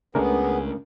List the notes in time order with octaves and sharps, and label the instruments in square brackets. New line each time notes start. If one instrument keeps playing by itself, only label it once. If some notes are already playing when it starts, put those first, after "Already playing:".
[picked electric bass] C#2 C#3 [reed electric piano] A3 D4 A#4 [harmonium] B3 [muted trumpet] G#4